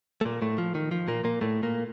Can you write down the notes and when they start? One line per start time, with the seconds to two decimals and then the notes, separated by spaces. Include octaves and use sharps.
0.21 A3
0.25 A#2 A#3
0.42 A2 A3
0.58 F3
0.75 D#3
0.91 F3
1.08 A#2 A#3
1.24 A#2 A#3
1.41 A2 A3
1.63 A#2 A#3